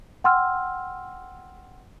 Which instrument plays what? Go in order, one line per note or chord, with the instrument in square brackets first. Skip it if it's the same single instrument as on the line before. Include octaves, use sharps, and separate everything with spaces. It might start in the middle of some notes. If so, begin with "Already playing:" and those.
[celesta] F#5 G5 C6 E6 F6